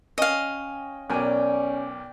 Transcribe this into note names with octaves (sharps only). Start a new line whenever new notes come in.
C#4 D#5 F5 G5
B1 C#4 A#4 D5 G5 G#5